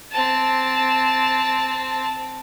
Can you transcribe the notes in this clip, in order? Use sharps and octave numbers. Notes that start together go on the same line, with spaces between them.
C4 A5